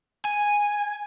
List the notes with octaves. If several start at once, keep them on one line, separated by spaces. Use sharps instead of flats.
G#5